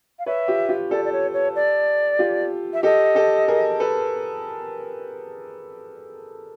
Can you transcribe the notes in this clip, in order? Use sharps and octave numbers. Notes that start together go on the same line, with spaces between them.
F5
B4 C#5 E5
F4 G4
F4 G4
G4 A4 D5
D5
C#5
C#5
D5
F4 G4
E5
G4 A4 D#5
G4 A4
G#4 A#4
A4 B4